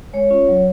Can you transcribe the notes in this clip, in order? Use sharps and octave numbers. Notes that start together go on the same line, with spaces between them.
G#3 C#5
C#4 F4
F#3